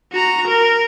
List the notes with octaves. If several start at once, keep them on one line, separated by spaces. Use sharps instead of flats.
F#4 A#5
A#4